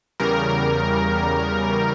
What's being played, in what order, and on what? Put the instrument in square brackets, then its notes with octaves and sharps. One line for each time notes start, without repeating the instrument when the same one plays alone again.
[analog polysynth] E2 C#3 G3 A#4